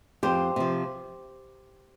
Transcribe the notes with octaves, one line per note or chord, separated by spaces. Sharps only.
F2 G4 C5
C3 F3